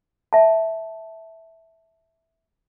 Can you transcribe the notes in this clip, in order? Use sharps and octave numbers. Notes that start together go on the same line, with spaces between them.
E5 A5